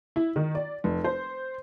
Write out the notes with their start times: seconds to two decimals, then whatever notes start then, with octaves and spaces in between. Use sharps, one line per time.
0.16 E4
0.36 D#3
0.55 D5
0.84 F1
1.04 C5